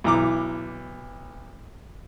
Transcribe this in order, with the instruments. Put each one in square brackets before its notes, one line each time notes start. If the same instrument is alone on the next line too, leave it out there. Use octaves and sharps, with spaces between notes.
[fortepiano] B1 E3 A#5 D6